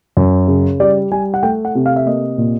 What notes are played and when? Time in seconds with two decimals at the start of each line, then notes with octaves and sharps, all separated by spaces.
0.17 F#2
0.48 C#3
0.80 G3 D5
1.11 G3 G#5
1.34 F#5
1.43 A3 G5
1.65 F#5
1.75 C3
1.86 F5
1.96 E5
2.06 A#3 D#5
2.38 A#2